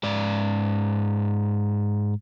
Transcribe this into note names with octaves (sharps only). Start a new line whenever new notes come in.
G#2 D5